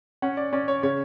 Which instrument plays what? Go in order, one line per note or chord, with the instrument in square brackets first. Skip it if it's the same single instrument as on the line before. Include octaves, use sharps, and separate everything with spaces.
[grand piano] C#4 F#5
D5
C#4 D5
C#5
C#3 C#5